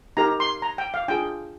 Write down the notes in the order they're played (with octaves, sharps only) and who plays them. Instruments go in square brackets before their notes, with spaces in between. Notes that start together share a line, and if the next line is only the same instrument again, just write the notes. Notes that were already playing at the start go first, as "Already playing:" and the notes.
[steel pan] D#4 G4 A#4 A#5
C6
A#5
G5
F5
D4 F4 G#4 G5